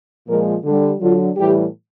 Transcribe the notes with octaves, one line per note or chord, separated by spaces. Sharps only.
A#2 F3 G#3 A#4
D3 G3
D3 F#3 F4
A2 E3 G3 G4